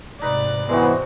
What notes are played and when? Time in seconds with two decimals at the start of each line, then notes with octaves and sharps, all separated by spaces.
0.22 G#2 C3 D#4 B4 D5
0.69 E3 G#3 B3 C4 F#4